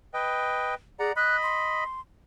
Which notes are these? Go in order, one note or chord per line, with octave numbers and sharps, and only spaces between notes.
B4 D#5 G5
G#4 D5 F#5 A#5
D#5 B5 F#6
C6